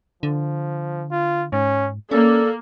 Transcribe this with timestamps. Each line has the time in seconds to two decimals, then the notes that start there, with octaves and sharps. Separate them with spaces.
0.23 D3 F3
1.11 F4
1.53 G#2 C#4
2.11 A#3 C#4 A4 D5